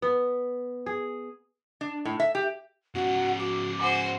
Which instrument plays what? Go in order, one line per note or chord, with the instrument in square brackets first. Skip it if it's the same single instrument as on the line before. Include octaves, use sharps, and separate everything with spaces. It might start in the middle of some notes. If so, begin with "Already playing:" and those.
[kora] B3
G#4
[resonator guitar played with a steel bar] D4
A2
E5
G4
[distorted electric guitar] G#2 C#3 [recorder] F#4 [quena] F#5
[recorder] F#4 [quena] D6
[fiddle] F#4 C5 [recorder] G#5